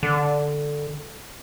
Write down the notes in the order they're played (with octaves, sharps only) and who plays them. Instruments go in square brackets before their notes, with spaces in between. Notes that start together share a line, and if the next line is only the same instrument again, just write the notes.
[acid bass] D3